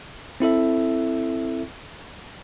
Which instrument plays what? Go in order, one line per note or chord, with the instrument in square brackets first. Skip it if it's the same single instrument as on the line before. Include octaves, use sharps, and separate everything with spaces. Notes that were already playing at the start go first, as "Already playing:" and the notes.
[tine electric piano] C4 E4 A4 E5